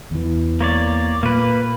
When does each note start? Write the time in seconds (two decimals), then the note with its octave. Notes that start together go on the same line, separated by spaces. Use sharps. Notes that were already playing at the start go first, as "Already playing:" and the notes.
0.11 E2 E3
0.61 A#3 C#5 D5
1.23 A#2 A#3 B4